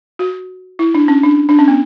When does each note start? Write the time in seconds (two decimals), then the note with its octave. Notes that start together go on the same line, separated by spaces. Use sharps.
0.19 F#4
0.79 E4
0.95 D4
1.08 C#4
1.23 D4
1.49 D4
1.59 C#4
1.68 B3